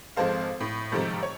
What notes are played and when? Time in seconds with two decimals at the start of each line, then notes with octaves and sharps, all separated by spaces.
0.17 G#1 F3 G#3 A4 C5 F5
0.60 A2
0.92 G#2 C3 D#3 F3 G3 A3
1.23 C#5